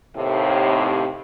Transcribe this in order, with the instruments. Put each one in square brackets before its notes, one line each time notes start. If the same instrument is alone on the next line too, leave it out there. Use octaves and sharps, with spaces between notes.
[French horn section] D#2 A2 C3